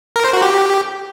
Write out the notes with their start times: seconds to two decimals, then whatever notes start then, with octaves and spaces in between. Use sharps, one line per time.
0.16 A#4
0.24 C5
0.33 F#4
0.42 G4